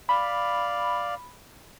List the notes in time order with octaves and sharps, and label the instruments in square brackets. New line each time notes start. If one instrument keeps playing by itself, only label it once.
[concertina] D5 F5 [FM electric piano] B5